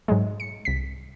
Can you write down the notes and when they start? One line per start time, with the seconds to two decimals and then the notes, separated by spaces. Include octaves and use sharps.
0.08 G#2 F#3 G#3
0.40 C#7
0.65 C2 B6